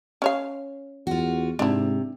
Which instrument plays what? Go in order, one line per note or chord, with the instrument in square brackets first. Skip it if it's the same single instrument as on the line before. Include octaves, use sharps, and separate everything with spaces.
[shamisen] C#4 C#5 F5
[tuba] E2 [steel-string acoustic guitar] F4 F#4
[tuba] G#2 [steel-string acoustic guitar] C3 [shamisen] D4 E4